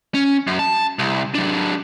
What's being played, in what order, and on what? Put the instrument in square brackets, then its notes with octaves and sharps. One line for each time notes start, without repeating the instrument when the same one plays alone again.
[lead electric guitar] C#4
F#2
A5
C2
F#3 D4